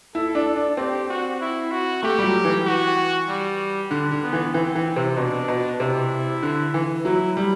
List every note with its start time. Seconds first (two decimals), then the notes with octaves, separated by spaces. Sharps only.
0.15 E4 A4
0.35 D4
0.56 D4
0.77 C4 G4
1.09 F#4
1.41 E4
1.71 F#4
2.03 A3 G4
2.19 G3
2.24 F#3
2.45 E3
2.66 F#4
3.28 G3
3.91 D3
4.12 D3
4.23 B3
4.33 E3
4.54 E3 C4
4.75 E3
4.96 C3
5.17 B2 D4
5.48 B2
5.79 C3 E4
6.43 D3
6.74 E3
7.05 F#3 E4
7.37 G3